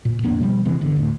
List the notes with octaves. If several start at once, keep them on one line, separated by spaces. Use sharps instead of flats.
A#2
D1 F2 A#3 D4
B2 F3 G3
C3 E3 G#3 C4
G1 D3
D2 A2